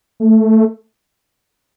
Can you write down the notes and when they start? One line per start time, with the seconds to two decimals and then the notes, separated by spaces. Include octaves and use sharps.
0.20 A3